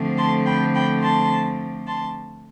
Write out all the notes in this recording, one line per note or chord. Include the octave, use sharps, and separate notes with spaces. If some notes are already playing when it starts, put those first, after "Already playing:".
Already playing: D3 F3 A3 C4
A5 C6
G5 B5
G5 B5
A5 C6
A5 C6